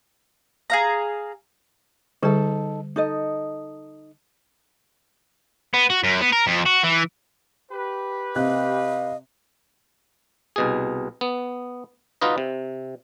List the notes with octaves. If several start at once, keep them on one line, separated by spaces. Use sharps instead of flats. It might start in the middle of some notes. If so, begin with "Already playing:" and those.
G#4 F5 A#5
D3 G3 D#4 G#4 A4
D#4 A4 D#5
B3
F#4
F#2
B3
A#4
F2
F#4
E3
G4 B4
C3 D#5 F5 F#6
C2 B2 G#4
B3
D#4 F4 F#4 B4 D#5
C3